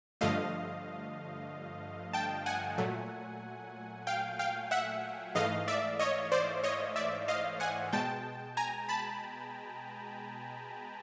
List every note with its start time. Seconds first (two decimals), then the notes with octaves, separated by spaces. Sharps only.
0.21 G2 D3 F3 A3 D#5 F5
2.13 G5 A5
2.46 F#5 G#5
2.78 A#2 F#3 A3
4.07 F5 G5
4.39 F5 G5
4.71 E5 F#5
5.35 G#2 E3 A3 D#5 F5
5.68 D5 E5
6.00 C#5 D#5
6.32 C5 D5
6.64 C#5 D#5
6.96 D5 E5
7.28 D#5 F5
7.60 F#5 G#5
7.93 B2 G#3 G5 A5
8.57 G#5 A#5
8.89 A5 B5